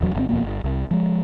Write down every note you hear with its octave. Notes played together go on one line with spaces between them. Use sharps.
D#1 E2 F#3
G1 D3 C4
D#1 F2 B2 A#3
G1
C2
F3 G#3